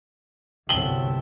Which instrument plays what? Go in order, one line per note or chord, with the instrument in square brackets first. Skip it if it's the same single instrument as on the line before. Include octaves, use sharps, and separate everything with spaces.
[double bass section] G1 C2 F#3 [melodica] C4 E5 A5 [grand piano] F#7 G7